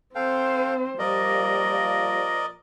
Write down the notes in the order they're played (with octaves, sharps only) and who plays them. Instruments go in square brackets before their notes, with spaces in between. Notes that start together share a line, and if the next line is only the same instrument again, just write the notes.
[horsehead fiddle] C4 C5 [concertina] A4 F5 G5
[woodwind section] A#2 F3 [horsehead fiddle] G3 [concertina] A#4 D5 D#5